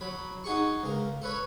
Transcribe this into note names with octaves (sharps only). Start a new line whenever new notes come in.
F#3 B5
D#4 F#4 G#4 C#6
C#2 A#4
A4 B4 C#5